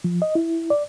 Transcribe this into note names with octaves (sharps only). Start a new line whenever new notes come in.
F3
D#5
E4
D5